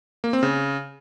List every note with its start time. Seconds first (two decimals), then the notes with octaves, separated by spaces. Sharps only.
0.24 A#3
0.33 C4
0.43 C#3